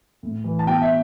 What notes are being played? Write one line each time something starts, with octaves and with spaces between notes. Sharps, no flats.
A2
E3
A5
B2 G5
E5